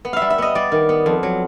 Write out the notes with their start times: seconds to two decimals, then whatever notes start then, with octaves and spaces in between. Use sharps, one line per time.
0.05 B3
0.13 E5 F5
0.22 G3
0.30 E5
0.38 B3 D#5
0.55 G3 D5
0.72 D#3
0.89 B3
1.06 F2
1.23 F#3